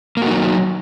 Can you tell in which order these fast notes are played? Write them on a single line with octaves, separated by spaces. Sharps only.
A#3 F#4 D#4 F#3